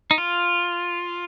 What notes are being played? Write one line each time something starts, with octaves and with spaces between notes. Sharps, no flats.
D#4
F4